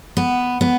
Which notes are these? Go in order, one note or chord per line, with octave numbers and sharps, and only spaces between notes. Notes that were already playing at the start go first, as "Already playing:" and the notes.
B3
B3